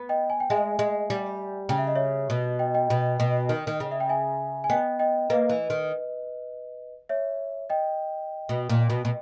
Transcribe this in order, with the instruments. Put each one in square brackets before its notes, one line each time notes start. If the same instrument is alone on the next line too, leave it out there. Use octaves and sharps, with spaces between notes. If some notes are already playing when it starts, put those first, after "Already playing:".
Already playing: [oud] B3
[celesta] D#5 G5
G#5
G5
[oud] G#3 [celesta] E5 G#5
[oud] G#3
G3
[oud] C#3 [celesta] G5
[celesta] E5
D#5
C#5 E5
[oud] B2
[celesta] D#5 G5
D#5 G5
[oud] B2
B2
D#3
D#3
C#3
[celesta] E5
G5
E5 G#5
G#5
[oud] B3 [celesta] D#5 G5
[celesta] D#5 G5
[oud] A#3 [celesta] B4 D#5
[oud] E3
D#3
[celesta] C#5 E5
D#5 G5
[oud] B2
A#2
B2
B2